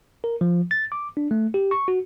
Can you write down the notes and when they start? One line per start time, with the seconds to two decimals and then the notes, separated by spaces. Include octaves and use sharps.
0.24 A#4
0.41 F3
0.71 A6
0.92 D6
1.17 D4
1.31 A3
1.54 G4
1.71 C#6
1.88 F#4